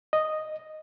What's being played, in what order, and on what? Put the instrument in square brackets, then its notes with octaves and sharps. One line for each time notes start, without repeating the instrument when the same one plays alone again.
[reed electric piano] D#5